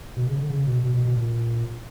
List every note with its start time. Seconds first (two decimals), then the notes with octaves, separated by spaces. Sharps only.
0.17 B2
0.27 C#3
0.38 D3
0.50 C#3
0.67 B2
0.84 B2
0.94 B2
1.05 B2
1.17 A#2